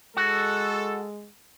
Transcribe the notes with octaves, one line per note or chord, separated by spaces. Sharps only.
G#3 F#4 A4